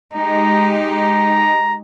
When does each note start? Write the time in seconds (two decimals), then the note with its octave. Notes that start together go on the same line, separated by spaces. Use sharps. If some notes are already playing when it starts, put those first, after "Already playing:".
0.14 G#3 D#4 G4 A#5
0.93 A#5